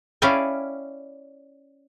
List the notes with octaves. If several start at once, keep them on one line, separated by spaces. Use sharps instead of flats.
C#4 E4 D5 F5 G5 G#5